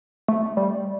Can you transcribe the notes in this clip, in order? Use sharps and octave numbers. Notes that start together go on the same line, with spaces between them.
A3
G3